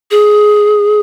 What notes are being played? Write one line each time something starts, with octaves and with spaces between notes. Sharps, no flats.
G#4